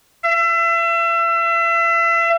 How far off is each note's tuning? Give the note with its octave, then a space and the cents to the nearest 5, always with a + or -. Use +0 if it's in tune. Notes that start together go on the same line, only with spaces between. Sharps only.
E5 +35